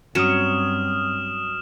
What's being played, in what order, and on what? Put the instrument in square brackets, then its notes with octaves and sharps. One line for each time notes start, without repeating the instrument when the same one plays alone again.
[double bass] G2 C4 [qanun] F#3 C#4 C#5 [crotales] D#6 F6 E7